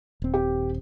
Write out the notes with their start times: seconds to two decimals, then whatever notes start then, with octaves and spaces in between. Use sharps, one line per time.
0.22 D#1 C4
0.34 G4